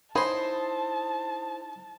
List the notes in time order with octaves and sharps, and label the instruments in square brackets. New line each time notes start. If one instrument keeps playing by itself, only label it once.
[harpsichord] D#4 C6 [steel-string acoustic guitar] E4 C5 [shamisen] C#5 G#5 B5 [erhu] A5